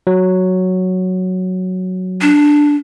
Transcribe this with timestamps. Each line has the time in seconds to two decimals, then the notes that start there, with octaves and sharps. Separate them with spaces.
0.07 F#3
2.21 D4